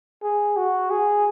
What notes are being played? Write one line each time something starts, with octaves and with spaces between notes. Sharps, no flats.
G#4
F#4
G#4